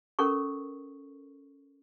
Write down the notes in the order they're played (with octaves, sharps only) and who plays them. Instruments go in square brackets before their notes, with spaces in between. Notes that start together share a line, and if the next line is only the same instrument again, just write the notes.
[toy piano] C#4 A4 A#4 C#6